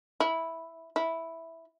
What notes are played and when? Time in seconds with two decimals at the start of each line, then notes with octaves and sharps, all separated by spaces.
0.20 E4
0.96 E4